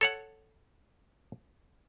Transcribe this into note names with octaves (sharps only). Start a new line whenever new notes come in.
A4 C#5 F#5